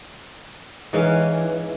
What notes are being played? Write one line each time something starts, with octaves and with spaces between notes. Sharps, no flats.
G#2 E3 C#4 F5